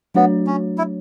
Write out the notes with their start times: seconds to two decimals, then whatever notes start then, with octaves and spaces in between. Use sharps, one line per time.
0.15 F#3 A3 B3 D4 F#4 C#5
0.47 C#4
0.78 E4